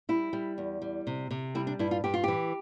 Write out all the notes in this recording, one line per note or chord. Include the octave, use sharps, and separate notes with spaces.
G3 E4
G3
E2
G3
C3
C3
G3 E4
D4
G2 E4
F4
G2 G4
F4
E3 G4